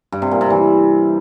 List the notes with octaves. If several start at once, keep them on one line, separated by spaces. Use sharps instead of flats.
G2
C3
A#2
C3
E3